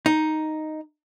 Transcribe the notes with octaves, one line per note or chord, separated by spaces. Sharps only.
D#4